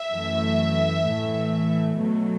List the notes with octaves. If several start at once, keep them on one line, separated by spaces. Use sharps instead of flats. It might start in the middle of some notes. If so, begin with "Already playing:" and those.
Already playing: E5
F#2 E3 A3
A2 E3 A3
B2 F#3 A3